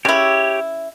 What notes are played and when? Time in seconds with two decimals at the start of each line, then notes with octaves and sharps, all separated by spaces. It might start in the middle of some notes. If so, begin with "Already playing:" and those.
0.05 C#3 E4 G4 C#5